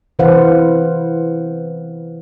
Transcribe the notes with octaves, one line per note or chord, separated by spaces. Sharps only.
C3 E3 B4 C5 F5 F#5